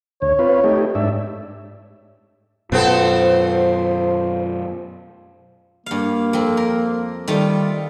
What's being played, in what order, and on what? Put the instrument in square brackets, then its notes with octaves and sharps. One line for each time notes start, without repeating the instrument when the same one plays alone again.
[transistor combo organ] D2 [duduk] C#5
[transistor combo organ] C4 F4 B4
A3 D#4 G4
G#2 D4 E5
[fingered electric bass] F#2 B2 [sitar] B3 C4 A4 [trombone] F4
[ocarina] C5
[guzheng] G2 F5 [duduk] A#3
[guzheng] F2 C4
A#4
[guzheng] D#3 A3 F4 [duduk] G3